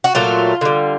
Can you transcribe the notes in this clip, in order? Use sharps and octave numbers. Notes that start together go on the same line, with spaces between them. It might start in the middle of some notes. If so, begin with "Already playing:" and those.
F#4
A#2 F#3 A3 F4
D3 G3